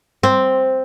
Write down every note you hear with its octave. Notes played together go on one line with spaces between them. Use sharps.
C4